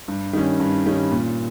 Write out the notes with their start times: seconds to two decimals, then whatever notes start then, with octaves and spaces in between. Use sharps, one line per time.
0.08 G2
0.33 D#3 G3 C#4
0.60 G2
0.86 D#3 G3 C#4
1.11 A#2